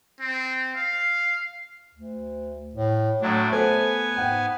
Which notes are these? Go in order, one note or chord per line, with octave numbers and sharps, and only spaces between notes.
C4
F5
D2
A2
A2 F#3 A3 D4
B3 A4 C5 G#5
G#2 F#5 G5